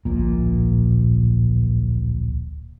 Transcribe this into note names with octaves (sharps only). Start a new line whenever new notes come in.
D1 A#1 A#2